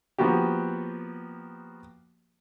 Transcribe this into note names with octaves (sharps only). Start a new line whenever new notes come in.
F3 A#3 B3 F#4 G4